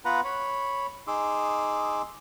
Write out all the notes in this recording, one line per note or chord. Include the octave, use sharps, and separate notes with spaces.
B3 F4 B4 F#5 A#5 B5
C#5 B5
D#4 G#4 C6 D6 E6